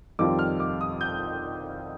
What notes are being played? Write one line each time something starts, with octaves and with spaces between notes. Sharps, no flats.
F2 D#3 G3 C4 F4 D6
F6
D6
D#6
G6